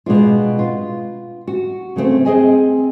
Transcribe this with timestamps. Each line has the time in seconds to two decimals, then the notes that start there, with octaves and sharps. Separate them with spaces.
0.06 B2 G#3 D4 F4
0.59 F4
1.47 F#4
1.96 C#3 A3 A#3 C4
2.25 C4 G#4 D#5 G#5